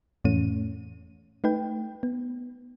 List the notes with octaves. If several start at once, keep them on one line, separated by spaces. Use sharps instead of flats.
F2 A2 E3 A3 C#4 D#7
A3 D#4 B4 G5
B3